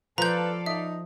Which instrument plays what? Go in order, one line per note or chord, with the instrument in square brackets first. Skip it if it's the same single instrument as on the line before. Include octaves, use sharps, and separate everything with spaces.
[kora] F3 [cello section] A4 D5 F5 [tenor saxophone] B4 [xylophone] A#5 G6
[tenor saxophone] D#4 [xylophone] E5